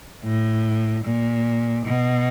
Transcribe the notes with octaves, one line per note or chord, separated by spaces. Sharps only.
A2
A#2
B2